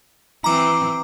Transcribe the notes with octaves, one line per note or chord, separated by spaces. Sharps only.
E3 C4 A#5 D6